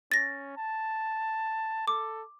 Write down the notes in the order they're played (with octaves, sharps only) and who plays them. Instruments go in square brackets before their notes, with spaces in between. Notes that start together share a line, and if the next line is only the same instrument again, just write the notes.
[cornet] C#4 [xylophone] A6 A#6
[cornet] A5
[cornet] A4 [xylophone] D6